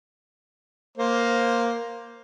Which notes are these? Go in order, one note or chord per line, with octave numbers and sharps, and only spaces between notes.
A#3 C5